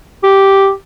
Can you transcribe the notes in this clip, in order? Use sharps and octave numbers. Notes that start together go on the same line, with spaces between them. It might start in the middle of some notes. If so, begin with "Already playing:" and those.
G4